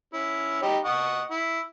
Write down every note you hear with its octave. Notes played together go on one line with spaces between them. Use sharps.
C#4 E4
D#4 G4 B5
D#5 F#5 C#6
E4